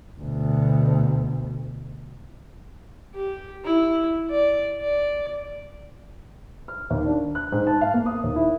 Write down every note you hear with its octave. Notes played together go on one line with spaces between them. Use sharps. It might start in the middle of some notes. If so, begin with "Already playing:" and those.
D2 B2
G4
E4
D5
D5
F6
D#2
D4
F#6
G#2
A5
F5
A#3
D#6
D#2
E4